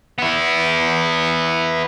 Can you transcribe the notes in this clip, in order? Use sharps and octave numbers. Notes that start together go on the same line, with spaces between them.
B3 E4